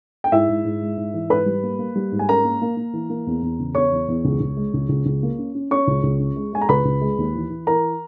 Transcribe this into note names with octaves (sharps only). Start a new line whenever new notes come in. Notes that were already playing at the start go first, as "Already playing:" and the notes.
G5
G#2 E4 E5
G#2
G#2
G#3
G#2
E3
G#2 B4 B5
G3
A#3
A#3
G3
G#2
G#5
C#4 A#4 A#5
A#3
A#3
A#3
E3
A#3
E2
E2
C#3
E2 C#5 C#6
E2
E2
C#2
C#2
G#3
C#2
C#2
C#2
A#3
C#4
C#4
C#4 C#5 C#6
C#2
C#2
C#4
G#3
G#3 G#5
A#5
C#2 B4 B5
C#2
G#3
D#2
E3
E3
E3 A#4 A#5